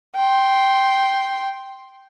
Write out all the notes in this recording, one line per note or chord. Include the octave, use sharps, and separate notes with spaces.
G5 C6